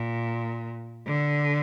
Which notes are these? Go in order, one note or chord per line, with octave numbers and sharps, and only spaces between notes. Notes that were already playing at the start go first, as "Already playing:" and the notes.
Already playing: A#2
D3